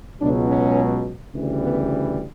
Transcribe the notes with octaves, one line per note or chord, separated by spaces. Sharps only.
C#2 B2 F#3 D4
C#4
D2 C#3 E3 G3
B3